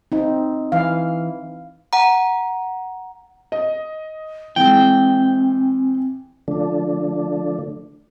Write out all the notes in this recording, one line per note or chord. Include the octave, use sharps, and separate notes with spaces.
C4 D#4
E3 F5
F#5 A#5
D#5
E3 G#3 C4 G5
D3 F3 A3 D4